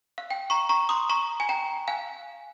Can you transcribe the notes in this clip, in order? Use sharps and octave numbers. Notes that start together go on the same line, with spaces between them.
F5
G5
A#5 C#6
A#5 C#6
C6 D#6
A#5 C#6
G#5
G5 A#5
F5 G#5